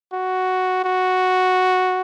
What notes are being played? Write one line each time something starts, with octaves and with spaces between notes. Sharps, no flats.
F#4
F#4